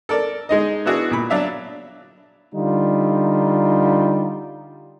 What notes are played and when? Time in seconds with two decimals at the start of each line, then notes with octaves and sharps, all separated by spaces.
0.09 A4 A#4 D5
0.49 G#3 D#4 D#5
0.85 B3 D4 E4 F#4 G#4
1.11 A#2 B5
1.30 F#3 D4 E5 F5
2.54 D3 G3 D#4 F4